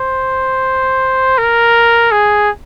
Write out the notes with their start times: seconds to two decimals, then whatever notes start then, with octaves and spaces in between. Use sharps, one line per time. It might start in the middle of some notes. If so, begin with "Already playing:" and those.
Already playing: C5
1.38 A#4
2.11 G#4